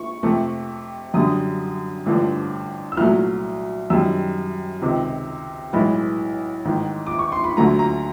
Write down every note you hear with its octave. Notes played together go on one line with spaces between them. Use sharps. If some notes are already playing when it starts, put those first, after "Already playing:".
Already playing: C#6
F2 C3 F3 A3
F#2 D3 G3 D#6
A1 G2 D3 F3 A3
E6
C2 A#2 F#3 A3 F6
F#2 D#3 G3 E6
C#2 C3 D#3
B1 A2 E3 G#3 B5
A1 G#2 D#3
D6
C#6
C6
B5
D2 D3 F#3 A3 A#5
A#5